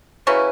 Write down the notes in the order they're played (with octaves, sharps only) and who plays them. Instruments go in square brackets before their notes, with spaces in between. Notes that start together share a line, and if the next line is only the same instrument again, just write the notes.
[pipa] C#3 F#3 C#4 E4 [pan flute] B4